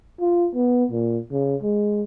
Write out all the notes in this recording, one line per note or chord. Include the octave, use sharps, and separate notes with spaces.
F4
B3
A#2
C#3
G#3